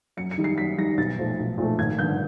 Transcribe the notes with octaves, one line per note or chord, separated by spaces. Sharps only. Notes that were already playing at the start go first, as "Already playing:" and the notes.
F#2 C#7
C#7
D#3 G3
C7
F#2 B6
D#3 G3 A#6
B1 A6
A#2 F3 A3
B1
A#2 F3 A3
G#1 G#6
G2 D3 G6